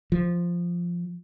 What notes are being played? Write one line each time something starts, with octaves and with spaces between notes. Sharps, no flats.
F3